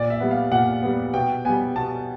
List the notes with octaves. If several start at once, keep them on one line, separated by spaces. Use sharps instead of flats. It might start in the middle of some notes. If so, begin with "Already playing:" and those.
Already playing: A#2 D5
E5
G3 B3
F5
A#2 F#5
G3 B3
B2 G5
G3 B3 G#5
B2 A5